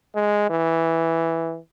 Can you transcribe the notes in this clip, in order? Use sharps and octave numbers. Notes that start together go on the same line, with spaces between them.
G#3
E3